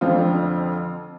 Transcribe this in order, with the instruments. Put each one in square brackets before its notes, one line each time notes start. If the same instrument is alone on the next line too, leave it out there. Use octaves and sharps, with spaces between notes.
[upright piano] F2 D3 F3 C4 F4